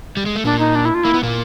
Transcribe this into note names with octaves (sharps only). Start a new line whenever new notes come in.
G3
G#3
A3
A#2 A#3 D4
D#4
D4
E4
F4
A#3 E4
B3
A#2 A#3